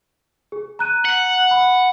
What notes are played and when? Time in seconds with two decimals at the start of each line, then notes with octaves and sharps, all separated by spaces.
0.52 G#4
0.79 A#5 F#6 D#7
1.05 F#5
1.51 B5